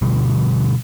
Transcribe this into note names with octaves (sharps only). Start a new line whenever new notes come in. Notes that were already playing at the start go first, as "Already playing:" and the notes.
B2 D3 F3 G3